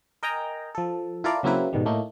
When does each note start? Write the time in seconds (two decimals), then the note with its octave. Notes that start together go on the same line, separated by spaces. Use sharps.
0.23 A#4 D#5 G5 G#5 A#5
0.75 F3 A4
1.24 E4 F4 A4 A#4 D5 F5
1.43 C#3 F#3 A#3 C4 E4 B4
1.73 G#2 B2 D#3 G3
1.86 A2 A3 A#3 D#4